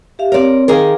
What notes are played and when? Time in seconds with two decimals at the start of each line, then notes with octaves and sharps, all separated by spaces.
0.19 G4 E5 F5
0.32 C4 A#4 C#5 D5
0.68 D#3 G#4 A#4 F5 D6